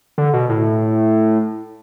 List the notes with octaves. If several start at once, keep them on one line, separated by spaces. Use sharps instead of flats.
D3
B2
A2